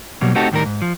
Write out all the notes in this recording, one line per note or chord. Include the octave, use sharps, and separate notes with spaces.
B2 F#3 G3 A#3
A3 C4 D#4 F#4 G4 A4
D#2 A2 D#3 G3 A#4
G#2
F3